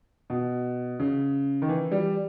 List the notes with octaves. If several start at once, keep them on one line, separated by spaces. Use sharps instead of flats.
B2
C#3
D#3
E3
G3